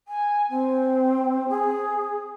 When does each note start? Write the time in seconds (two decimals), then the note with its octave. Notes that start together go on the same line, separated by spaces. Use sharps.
0.08 G#5
0.50 C4
1.49 G#4